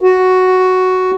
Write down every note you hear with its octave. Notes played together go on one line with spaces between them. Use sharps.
F#4